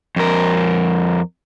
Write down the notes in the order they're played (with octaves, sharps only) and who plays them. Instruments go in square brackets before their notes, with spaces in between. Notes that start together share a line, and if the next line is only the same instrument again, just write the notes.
[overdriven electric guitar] F2 A#4